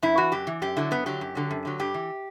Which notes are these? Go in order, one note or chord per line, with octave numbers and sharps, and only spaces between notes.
F#2 E4
E3 F#4
F#2 G4
E3
F#2 G4
D3 F#3 E4
F#2 B3
D3 F#3 G4
F#2
D3 F#3
F#2
D3 F#3
G2 G4
E3